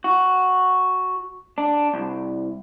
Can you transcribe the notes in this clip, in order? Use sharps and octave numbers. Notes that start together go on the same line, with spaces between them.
F#4
D4
C2